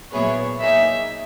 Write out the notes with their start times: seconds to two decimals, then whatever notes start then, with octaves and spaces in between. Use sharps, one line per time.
0.12 A#2 F#3 B3 E4 G#4 C#5
0.60 A#3 D#4 G#4 C#5 E5